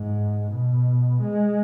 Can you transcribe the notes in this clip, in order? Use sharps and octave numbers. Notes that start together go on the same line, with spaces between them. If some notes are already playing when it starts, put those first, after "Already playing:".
Already playing: G#2
B2
G#3